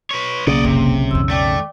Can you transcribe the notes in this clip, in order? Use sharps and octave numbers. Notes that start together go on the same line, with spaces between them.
B4 C#5
B1 C#3 A#3 D5 D#5
F1 C3
F2 D#3 E6
A3 D5 G5 D6